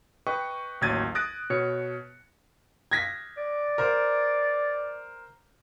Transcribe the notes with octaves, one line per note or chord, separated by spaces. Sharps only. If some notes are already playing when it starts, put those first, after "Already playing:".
B4 D#5 G5 C#6
A1 D#2 F#3 G#6 A6 D#7
D#6 F#6 A6 A#6 D7
B2 C#5 C#7
G#6 A#6 B6
D5
A#4 C5